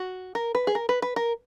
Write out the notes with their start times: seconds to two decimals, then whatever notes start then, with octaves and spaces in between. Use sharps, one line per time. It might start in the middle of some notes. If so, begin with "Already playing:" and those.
Already playing: F#4
0.35 A#4
0.55 B4
0.67 G#4
0.75 A#4
0.89 B4
1.02 B4
1.16 A#4